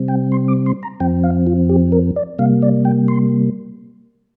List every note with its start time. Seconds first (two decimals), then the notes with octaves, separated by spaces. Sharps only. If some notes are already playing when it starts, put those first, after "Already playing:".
Already playing: C3 G3 C4
0.08 G5
0.32 C6
0.48 D6
0.66 C6
0.83 A#5
1.00 F2 F3 C4 G5
1.24 F5
1.47 F4
1.69 G4
1.92 A#4
2.16 D5
2.39 C3 G3 A#3 F5
2.62 D5
2.85 G5
3.08 C6